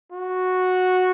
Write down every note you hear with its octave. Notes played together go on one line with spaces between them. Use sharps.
F#4